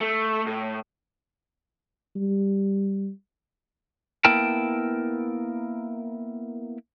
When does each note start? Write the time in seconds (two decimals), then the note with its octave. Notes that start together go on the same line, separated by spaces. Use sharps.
0.01 A3
0.47 A2
2.16 G3
4.25 A#3 B3 E4 A#4 G5 A5